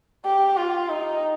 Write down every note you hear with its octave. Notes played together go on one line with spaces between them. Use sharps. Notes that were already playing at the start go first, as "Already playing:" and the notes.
G4
F4
D#4